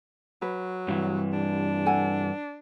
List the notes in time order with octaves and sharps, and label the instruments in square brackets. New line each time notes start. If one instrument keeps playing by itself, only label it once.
[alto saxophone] F#3 [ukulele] B4
[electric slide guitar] G2 E3
[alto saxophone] D4
[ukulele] A4 F#5 G#5